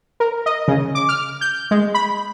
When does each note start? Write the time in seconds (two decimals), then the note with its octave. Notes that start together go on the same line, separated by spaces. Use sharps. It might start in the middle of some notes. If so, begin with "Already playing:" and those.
0.20 A#4
0.46 D#5
0.68 C#3
0.95 D6
1.09 F6
1.41 G6
1.71 G#3
1.94 B5